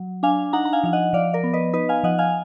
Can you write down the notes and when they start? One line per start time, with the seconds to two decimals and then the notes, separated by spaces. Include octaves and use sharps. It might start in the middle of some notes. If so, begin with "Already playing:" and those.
Already playing: F#3
0.23 D4 F5 G#5
0.53 D#4 F#5 A#5
0.65 A#5
0.73 F5 G#5
0.84 F3 F5
0.93 D#5 F#5
1.13 F3 D5 F5
1.33 A#4 D5
1.44 B3
1.53 B4 D#5
1.73 D#4 B4 D#5
1.89 F5 G#5
2.03 F3 D#5 F#5
2.19 F5 G#5